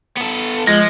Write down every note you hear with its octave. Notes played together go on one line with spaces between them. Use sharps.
B3 A4
F3 G#3 A#6